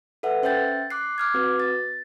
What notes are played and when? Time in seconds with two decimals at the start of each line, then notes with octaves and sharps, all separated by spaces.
0.23 A4 B4 E5 F#5
0.43 C#4 C5 E5 G5 G6 A6
0.90 D6 F#6 C7
1.18 D6 F6 G#6
1.34 C4 F#4 B4
1.60 A6